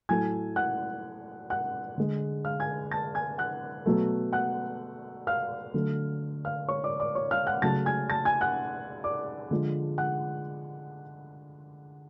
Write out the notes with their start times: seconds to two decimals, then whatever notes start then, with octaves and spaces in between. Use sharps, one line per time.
0.09 A2 F#3 A3 G#5 G#6
0.56 F#5 F#6
1.50 F#5 F#6
1.98 D3 G#3
2.45 F5 F6
2.60 G#5 G#6
2.91 A5 A6
3.15 G#5 G#6
3.38 F#5 F#6
3.86 B2 F#3 A3
4.33 F#5 F#6
5.27 F5 F6
5.74 D3 F#3 A3
6.45 F5 F6
6.68 C#5 C#6
6.84 D5 D6
7.00 D5 D6
7.15 C#5 C#6
7.31 F5 F6
7.47 F#5 F#6
7.62 C#3 F#3 A3 A5 A6
7.86 G#5 G#6
8.10 A5 A6
8.25 G#5 G#6
8.41 F#5 F#6
9.04 D5 D6
9.51 D3 F3 G#3
9.98 F#5 F#6